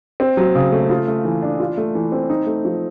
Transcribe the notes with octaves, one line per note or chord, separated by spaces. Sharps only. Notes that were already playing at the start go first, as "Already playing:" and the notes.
C4
F#3
C#3
A3
F4
A3
E3
D4
F4
A3
E3
C4
D#4
A3
F3